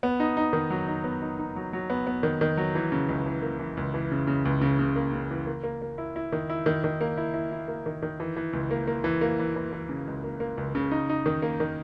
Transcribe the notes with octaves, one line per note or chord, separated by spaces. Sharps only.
B3
D#4
D#4
D#3
F#3
D#4
B3
D#4
D#4
F#3
F#3
B3
B3
D#3
D#3
F#3
E3
C#3
C#2
E3
A#3
E3
C#2
E3
C#3
C#3
C#2
C#3
C#3
A#3
C#3
E3
A#3
A#3
A#3
E4
E4
D#3
E4
D#3
D#3
A#3
E4
E4
E4
A#3
D#3
D#3
E3
E3
C#2
A#3
A#3
E3
A#3
E3
E3
E3
C#3
C#2
A#3
A#3
C#2
C#3
D#4
D#4
D#3
A#3
D#3